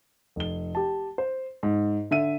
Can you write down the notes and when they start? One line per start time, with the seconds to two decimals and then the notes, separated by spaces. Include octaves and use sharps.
0.36 F1 G7
0.75 G4 A5
1.18 C5
1.63 G#2
2.11 D3 E5 D#7